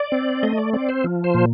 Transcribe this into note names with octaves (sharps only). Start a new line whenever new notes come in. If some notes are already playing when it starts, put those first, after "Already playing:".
Already playing: D5
C4
A3 D#5
D5
C4 D5
C5
F3
C5
A#2